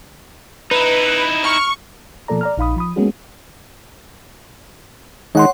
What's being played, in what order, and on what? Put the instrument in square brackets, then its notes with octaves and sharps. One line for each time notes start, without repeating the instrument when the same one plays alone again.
[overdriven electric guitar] D#4 E4 [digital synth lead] B4
[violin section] C#6 [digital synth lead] F6
[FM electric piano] B2 F3 A#3 A4 D5 A#5
D5 A#5 F6
A#1 D#4 F5 B5 D#6
F3 B5 D#6
G#3 A#3 B3 C#4 F#4 G#4
[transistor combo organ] D#3 G#3 D#4 [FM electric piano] C#5 F#5 C6